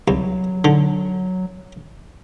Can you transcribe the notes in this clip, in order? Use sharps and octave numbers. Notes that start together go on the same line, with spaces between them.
C2 F#3
D3